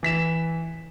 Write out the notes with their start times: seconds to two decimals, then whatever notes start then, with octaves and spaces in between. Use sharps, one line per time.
0.03 E3 B6 E7